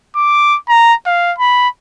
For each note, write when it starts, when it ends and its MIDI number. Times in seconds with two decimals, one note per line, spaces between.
0.16 0.57 86
0.69 0.93 82
1.06 1.33 77
1.38 1.68 83